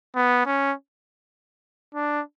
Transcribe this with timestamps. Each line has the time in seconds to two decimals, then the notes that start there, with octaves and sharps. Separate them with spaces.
0.16 B3
0.46 C#4
1.95 D4